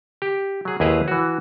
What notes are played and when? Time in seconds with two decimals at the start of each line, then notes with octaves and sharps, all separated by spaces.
0.22 G4
0.65 F#3 G#4
0.80 D#2 E4 G#4 B4 C5 A#5
1.08 E3 F#4